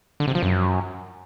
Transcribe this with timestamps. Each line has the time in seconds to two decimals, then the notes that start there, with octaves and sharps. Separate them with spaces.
0.20 D3
0.28 C3
0.35 F3
0.43 F#2